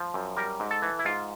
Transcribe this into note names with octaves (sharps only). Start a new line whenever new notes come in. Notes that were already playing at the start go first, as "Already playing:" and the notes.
Already playing: F3
F#2
G3 A#4
G#2
A4
E3
E4
G#2 F4